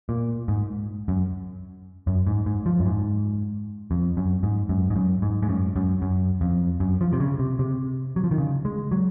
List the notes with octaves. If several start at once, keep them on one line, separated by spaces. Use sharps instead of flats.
A#2
G#2
F#2
F#2
G#2
G#2
F3
F#2
G#2
F2
F#2
G#2
F#2
G#2
F#2
G#2
G#2
F#2
F#2
F#2
F2
F#2
F3
C3
C#3
C3
C3
F#3
F3
D#3
C#3
G#3
F#3